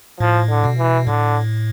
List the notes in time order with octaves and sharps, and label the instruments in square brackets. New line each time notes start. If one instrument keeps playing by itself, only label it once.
[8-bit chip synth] A2 [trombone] F3
[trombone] D3
[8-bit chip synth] B2
[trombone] E3
[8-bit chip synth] A2 [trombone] D3